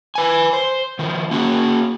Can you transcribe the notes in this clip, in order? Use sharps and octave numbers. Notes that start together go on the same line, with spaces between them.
B4 G#5
C5
D#3 F3
A#3 C#4 F#4 G#4